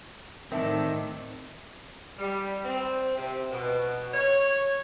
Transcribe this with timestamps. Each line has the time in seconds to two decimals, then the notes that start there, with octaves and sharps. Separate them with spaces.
0.52 A2 D#3 C4 A4 A#4 D5 E5 A5
2.18 G3
2.64 C4
3.17 C3
3.51 B2
4.13 C#5